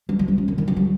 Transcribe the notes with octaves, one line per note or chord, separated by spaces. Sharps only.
G3
F3
G3
C#4
D#3
D#3
F3
G3